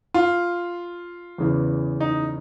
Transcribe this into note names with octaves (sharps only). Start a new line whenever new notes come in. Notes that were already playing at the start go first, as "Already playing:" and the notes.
F4
E2 C#3 E3
D#4